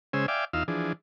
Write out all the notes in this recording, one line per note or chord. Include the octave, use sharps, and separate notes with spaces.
C#3 G#3 C#4 C5 G#5 E6
D5 E5 F5 G5 G#5 D6
E2 D#4 F4 F5 E6
E3 F3 D4 G#4